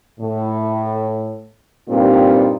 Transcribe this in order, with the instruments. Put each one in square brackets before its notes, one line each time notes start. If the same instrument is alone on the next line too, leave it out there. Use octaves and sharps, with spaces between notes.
[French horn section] A2
G2 A#2 C4 D#4 F4